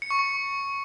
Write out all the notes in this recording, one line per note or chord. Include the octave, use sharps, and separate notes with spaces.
C#7
C#6
C#7